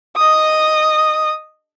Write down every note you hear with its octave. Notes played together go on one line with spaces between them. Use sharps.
D#5 D#6